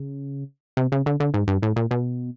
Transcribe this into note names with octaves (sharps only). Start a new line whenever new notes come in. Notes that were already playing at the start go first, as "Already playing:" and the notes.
Already playing: C#3
C3
C#3
D3
D3
G#2
G2
A2
A#2
B2